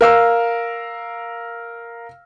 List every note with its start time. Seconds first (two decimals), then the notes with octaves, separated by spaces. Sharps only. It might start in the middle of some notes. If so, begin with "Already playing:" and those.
0.01 A#4 F5 E6